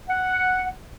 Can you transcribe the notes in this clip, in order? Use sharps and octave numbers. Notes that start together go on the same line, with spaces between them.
F#5